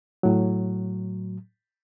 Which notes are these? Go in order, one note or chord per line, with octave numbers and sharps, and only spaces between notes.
A2 F#3